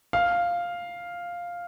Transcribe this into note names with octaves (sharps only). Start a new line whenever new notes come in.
F5